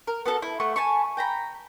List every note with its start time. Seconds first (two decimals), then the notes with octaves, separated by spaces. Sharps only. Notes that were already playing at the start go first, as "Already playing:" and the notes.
0.07 A#4
0.26 B3 F#4 A4 A5
0.42 E4
0.60 A3 E5 F#5 C#6
0.76 G#5 A5 B5 C#6
1.17 G5 A#5 B5